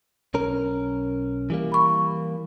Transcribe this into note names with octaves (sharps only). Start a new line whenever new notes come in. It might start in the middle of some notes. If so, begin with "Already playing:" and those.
B1 C#4 A#4
E3 G3 A#3
B5 C#6